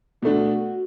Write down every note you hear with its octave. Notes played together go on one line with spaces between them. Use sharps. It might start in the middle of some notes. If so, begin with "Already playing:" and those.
B2 A3 D4 F#4